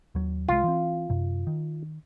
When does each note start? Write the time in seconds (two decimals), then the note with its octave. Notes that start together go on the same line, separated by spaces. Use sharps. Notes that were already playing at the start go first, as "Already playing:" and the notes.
0.15 D#2 F#3
0.49 C2 G#3 F4
0.64 E3 C4
1.10 F#2 C3
1.47 D#3